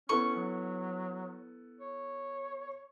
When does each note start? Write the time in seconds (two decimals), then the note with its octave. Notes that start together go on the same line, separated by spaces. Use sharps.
0.09 B3 C#4 E4 A4 C#6
0.36 F#3
1.80 C#5